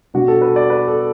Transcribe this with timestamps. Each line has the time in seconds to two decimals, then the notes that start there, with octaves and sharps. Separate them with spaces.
0.14 B2 G3 B3 D4 F#4
0.28 A4
0.42 B4
0.56 D5
0.70 B4
0.88 A4